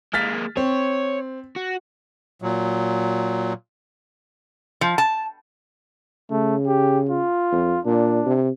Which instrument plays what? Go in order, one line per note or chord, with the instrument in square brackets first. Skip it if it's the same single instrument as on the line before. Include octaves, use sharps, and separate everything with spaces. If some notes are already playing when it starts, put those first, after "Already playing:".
[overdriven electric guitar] G#3 A#3 [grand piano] F6 A6 B6
[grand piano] C4 [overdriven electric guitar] C#5
[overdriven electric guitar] F#4
[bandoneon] A#2 F#3
[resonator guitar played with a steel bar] F3
A5
[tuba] C#3 [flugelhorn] A3
[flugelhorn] G4
F4
[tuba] F2
[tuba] A#2 [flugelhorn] D4
[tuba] C3